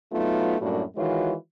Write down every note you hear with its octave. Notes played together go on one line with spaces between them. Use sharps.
F#3 A3 B3 D#4 F4
F#2 A2 G3 A#3 D4 F#4
D#3 E3 G#3 F4 F#4 C#5